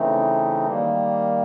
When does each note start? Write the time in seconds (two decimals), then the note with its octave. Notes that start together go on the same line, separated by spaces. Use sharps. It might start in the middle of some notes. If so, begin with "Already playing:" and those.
Already playing: C#3 E3 A3 C4 D#4
0.67 D#3 G3 A#3